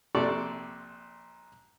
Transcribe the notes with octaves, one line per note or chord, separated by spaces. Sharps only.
A#1 C3 A4 D5 C#6